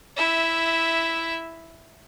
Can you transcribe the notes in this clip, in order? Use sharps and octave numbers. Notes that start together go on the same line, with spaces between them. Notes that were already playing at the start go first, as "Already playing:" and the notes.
E4 E5